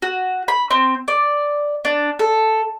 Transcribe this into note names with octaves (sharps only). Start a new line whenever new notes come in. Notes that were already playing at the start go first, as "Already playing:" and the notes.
F#4
B5
C4
D5
D4
A4